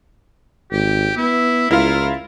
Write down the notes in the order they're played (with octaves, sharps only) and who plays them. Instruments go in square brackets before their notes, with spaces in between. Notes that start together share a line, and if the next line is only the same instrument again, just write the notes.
[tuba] G#1 [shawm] G4
[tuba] B3 [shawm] E4
[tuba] C#2 [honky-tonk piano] E4 F4 [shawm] A#4